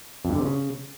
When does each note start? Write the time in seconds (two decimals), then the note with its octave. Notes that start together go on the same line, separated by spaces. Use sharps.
0.25 F2
0.30 G2
0.35 D3
0.40 C3
0.45 C#3